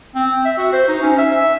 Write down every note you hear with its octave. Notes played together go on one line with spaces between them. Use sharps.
C4
E5
F#4
C5
D#4
C#4
E5
E5